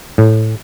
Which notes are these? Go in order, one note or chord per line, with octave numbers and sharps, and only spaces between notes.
A2